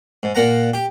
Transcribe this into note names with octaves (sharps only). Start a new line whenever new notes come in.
G#2
A#2 A#3 F#5 A#5
G4